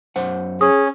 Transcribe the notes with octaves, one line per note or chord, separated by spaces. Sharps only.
F#2 C5 F#5
C#4 G#4 D#6